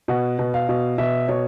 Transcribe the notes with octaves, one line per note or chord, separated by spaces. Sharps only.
B2 F#5
B2
F5
B2
B2 E5
B2 C#5